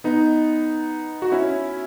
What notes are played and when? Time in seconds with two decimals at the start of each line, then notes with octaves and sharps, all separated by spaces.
0.04 B3 D#4
1.22 F#4
1.32 C#4 E4